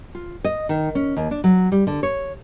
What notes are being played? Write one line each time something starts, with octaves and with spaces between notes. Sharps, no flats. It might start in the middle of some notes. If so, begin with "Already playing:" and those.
F4
D#5
D#3
C#4
D#2
D4
F#3
G3
D3
C#5